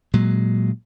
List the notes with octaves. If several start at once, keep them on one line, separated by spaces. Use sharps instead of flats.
A#2 F#3 G#3